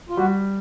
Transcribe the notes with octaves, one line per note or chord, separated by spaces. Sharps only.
F4
G3 F#4